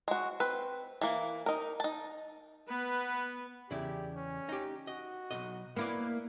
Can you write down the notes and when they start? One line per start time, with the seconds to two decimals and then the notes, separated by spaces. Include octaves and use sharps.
0.08 G#3 F#4
0.40 C4 B4
1.01 E3 A#3
1.46 D#4 A#4
1.80 D#4 A5
2.68 B3 B4
3.71 E2 C#3 E4 G4 D5
4.16 C#4
4.49 D#4 G4
4.87 F#4 D#5
5.31 B1 G2 D#5
5.76 A#3 B3 E4 A#4 B4 D5